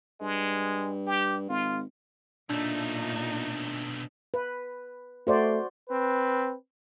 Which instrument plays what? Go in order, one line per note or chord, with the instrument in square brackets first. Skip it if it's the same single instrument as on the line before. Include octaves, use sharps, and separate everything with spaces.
[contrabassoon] G2 [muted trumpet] G#3
[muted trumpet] G4
[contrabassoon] G#1 [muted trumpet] F4
[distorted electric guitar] B1 A3 [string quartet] A#2 D#4 [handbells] D4 G6
[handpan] B4
[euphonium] A3 [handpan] F#4 C5 D5
[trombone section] C4 B4